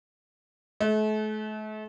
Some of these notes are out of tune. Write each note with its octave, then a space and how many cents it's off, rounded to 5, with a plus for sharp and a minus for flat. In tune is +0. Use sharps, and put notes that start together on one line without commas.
A3 -40